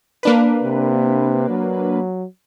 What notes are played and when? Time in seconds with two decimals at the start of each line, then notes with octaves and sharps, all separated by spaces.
0.23 A#3 D4 B4
0.63 C3
1.50 F#3